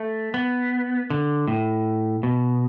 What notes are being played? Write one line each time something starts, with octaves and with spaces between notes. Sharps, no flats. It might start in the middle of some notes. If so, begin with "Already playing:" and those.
Already playing: A3
B3
D3
A2
B2